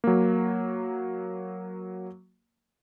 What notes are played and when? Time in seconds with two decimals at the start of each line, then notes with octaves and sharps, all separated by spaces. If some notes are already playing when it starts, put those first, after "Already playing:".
0.04 F#3 A#3